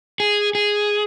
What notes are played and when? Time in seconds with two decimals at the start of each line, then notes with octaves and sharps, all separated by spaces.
0.20 G#4
0.55 G#4